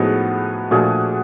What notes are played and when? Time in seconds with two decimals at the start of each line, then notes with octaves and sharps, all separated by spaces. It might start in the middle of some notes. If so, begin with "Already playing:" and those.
Already playing: A2 F3 G#3 B3 D#4 F#4 G#4
0.71 A#2 F3 A3 D4 F#4 G#4